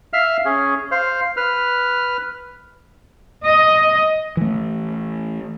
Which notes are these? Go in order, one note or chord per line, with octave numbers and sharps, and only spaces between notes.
E5 F5 F6
C#4 G#4
C5 F5
B4 F6
D#5
E3 A3